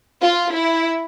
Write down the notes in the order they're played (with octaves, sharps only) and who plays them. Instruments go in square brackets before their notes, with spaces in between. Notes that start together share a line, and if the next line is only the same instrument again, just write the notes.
[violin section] F4
E4